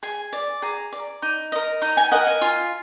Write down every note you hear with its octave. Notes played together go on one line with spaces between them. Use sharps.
G#4 G#5
D5
G#4 A#5
D5
D#4
A#4 D#5
D#4 A#5
G#5
A#4 D#5 F#5
G#5
F4